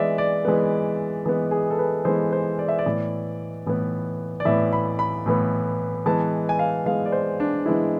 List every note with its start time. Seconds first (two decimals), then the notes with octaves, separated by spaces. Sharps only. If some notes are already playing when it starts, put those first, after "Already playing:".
Already playing: E3 G#3 B3 D5 E5
0.18 D5
0.45 E3 G#3 B3
1.26 E3 G#3 B3
1.51 G#4
1.70 A4
1.79 B4
2.05 E3 G#3 B3 C5
2.32 C5
2.59 D5
2.69 E5
2.79 D5
2.86 A2 E3 B3
3.66 A2 E3 B3
4.40 D5
4.45 A2 E3 B3 E5
4.73 B5
4.99 B5
5.26 A2 E3 B3
6.06 E3 G#3 B3 A5
6.49 G#5
6.59 F5
6.86 E3 G#3 B3 F5
7.06 D5
7.12 C5
7.40 D4
7.66 E3 G#3 B3 E4